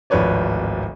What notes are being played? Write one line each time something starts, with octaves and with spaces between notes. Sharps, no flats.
D1 G#1 F3 B4 C#5 D5